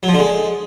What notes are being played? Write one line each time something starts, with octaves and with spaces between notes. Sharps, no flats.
F#3
F3
D3
G#3